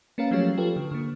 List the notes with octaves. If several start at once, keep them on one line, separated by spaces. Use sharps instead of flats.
A#3 C#4 A#4 B4 F5
F3 F#3 A3 C#4 G4 C#5
F4 G4 A4 B4
D3
D3 A#3